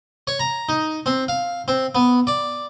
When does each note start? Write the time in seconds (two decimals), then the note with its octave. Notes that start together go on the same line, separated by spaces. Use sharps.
0.27 C#5
0.39 A#5
0.69 D#4
1.06 C4
1.28 F5
1.68 C4
1.95 B3
2.27 D5